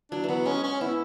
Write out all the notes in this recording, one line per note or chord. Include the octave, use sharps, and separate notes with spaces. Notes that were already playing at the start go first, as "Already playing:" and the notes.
F#3 D4
E3 F#3 B3
G#3 C#4
C#4
B3 E4